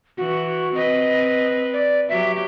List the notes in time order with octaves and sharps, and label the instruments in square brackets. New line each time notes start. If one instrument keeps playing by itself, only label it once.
[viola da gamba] E3 [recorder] F#4
[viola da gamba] C4 B4 [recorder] D#5
[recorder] D5
[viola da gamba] F#3 G4 [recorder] E5